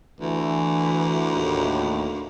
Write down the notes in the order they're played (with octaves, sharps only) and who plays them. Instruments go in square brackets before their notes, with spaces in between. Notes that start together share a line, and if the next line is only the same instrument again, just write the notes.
[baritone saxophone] D2 [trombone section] E3
[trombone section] D#2 A2